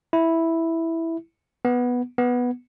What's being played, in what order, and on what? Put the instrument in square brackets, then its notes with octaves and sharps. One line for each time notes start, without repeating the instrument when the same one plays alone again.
[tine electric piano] E4
B3
B3